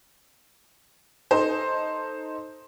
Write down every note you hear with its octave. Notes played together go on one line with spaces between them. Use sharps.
D#4 A4 C5